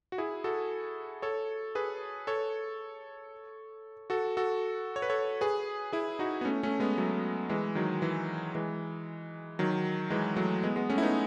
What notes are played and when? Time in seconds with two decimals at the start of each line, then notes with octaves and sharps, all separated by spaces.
0.12 F#4
0.18 E4 G#4
0.44 F#4 A4
1.22 A4 C#5
1.75 G#4 B4
2.27 A4 C#5
4.10 F#4 A4
4.37 F#4 A4
4.96 C#5
5.02 B4
5.10 A4 C#5
5.41 G#4 B4
5.93 E4 G#4
6.19 D#4 F#4
6.41 B3
6.45 A3 C#4
6.63 A3 C#4
6.80 G#3 B3
6.98 F#3 A3
7.50 E3 G#3
7.75 D#3 F#3
8.02 E3
8.55 E3 G#3
9.59 D#3 F#3
10.10 E3 G#3
10.37 F#3 A3
10.64 G#3 B3
10.76 G#3 B3
10.89 A3 C#4
10.98 E4
11.02 B3 D#4